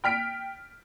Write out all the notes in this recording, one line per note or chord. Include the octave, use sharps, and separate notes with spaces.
G5 F6 B6 D7